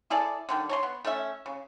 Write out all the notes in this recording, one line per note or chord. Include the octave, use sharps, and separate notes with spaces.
E4 G#4 A4 D5
D3 D#3 G3
C#5 A#5 C6
B3
A3 C#4 E5
C#3